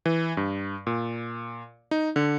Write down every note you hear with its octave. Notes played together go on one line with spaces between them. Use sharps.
E3
G2
A#2
D#4
D3